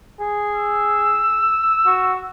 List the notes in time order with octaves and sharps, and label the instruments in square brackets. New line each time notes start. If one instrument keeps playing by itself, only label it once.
[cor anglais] G#4
[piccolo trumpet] E6
[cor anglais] F#4